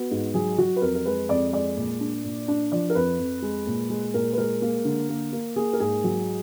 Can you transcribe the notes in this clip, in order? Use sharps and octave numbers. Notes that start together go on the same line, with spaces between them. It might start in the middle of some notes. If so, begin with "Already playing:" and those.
Already playing: B3 F#4
G#2
F#3 G#4
F#3 F#4
B4
F2 A#4
A#4
G#3 B4
F2 D5
G#3 D5
A#2
D4
A#2
D4
F3 D5
A#4
F2 B4
F2
G#3
A#2
G#3
A#2 A#4
B4
G#3 A#4
A#3
D3
A#3
A#3
A#3 G#4
A#4
G#2 G#4
F#3